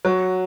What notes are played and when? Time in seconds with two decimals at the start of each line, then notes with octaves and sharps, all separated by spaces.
0.05 F#3